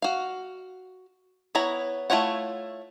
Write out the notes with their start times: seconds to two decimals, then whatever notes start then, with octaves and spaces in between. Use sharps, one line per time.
0.02 F#4 F5
1.55 B3 E4 C#5 A#5
2.10 A3 E4 F4 C#5 F#5